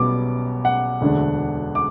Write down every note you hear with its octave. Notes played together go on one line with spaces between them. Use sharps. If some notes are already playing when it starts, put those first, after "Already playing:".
Already playing: B1 B2 G3 B3 D6
F#5
E1 D2 D3 A3 D4
D6